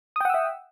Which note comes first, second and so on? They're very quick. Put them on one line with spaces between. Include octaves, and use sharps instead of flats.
D#6 G5 F#5 E6 E5